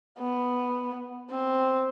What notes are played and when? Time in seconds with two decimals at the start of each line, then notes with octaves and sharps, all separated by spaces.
0.19 B3
1.30 C4